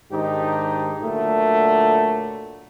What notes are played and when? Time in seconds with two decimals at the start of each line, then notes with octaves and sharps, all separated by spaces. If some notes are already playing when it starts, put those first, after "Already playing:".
0.12 G#2 D#3 D4 D#4 G4
1.02 A#2 D3 F#3 A3